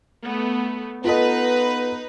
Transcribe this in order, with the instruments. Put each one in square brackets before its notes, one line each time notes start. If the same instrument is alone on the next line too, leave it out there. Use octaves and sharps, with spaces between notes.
[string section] A3 B3
[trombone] B3 [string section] D#4 B4 [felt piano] F4 A4 D#5